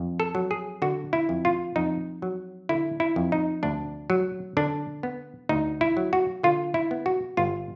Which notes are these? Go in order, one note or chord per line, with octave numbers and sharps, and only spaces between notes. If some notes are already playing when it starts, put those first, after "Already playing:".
Already playing: F2
A4
F#3
G#4
D3 F#4
E4
F2
F4
F2 D#4
F#3
D3 E4
E4
F2
D#4
D2 D4
F#3
D3 D4
B3
D2 D#4
E4
F#3
F#4
D3 F4
E4
B3
F#4
G1 F4